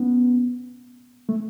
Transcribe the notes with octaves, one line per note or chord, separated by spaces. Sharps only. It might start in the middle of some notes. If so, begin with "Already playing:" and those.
Already playing: B3 C#4
A3